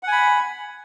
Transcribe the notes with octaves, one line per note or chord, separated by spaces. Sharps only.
F#5 G#5 B5